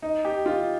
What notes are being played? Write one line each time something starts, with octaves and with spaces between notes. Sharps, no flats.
D#4
G4
F4